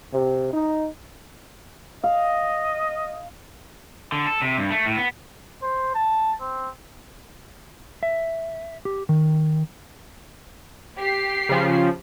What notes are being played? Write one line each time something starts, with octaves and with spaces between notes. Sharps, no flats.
C3
D#4
D#5 F5
D3
A4
C3
G2
A3
A2
B3
C5
A5
C4
E5
G4
D#3
G4 C7
C#3 F3